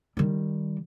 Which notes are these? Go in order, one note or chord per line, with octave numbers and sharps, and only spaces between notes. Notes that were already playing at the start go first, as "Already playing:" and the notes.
D#3 G3